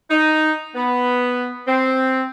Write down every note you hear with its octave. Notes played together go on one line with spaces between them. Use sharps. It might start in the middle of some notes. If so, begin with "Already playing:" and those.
D#4
B3
C4